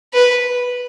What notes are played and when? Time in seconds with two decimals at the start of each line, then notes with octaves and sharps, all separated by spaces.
0.13 B4